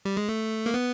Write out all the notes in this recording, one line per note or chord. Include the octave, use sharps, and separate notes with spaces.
G3
G#3
A3
A#3
B3